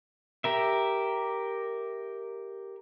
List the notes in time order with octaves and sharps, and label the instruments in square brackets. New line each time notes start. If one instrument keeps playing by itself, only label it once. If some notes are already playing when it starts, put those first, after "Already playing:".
[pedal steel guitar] G4 A#4 E5